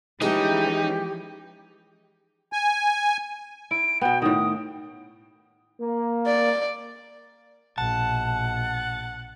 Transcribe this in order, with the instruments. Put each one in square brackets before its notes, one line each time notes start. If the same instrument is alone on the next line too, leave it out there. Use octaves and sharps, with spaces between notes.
[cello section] E3 F3 C#4 [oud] G#3 [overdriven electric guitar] D#4 [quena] G4
[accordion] G#5
[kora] E4 [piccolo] D7
[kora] B2 B3 [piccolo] G5
[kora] A2 D#3 [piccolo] D#6
[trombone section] A#3
[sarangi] D5
[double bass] A#1 B2 [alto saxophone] F#5 [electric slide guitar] A5